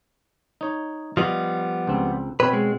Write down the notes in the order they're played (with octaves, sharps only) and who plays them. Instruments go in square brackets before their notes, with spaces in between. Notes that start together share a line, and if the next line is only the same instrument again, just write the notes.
[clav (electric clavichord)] D#4 C#5
[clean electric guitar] F3 G3 B3 [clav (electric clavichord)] D#5
[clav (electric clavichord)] C#2 C4
[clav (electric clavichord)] B2 C4 C#5 [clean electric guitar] B4
[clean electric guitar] G#3